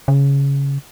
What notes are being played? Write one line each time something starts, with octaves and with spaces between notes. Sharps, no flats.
C#3